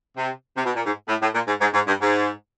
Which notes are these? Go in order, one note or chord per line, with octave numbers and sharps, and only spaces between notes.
C3
C3
B2
A#2
G#2
A2
A2
A#2
G#2
G#2
G#2
G2
G#2